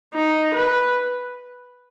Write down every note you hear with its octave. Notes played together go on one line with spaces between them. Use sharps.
D#4
B4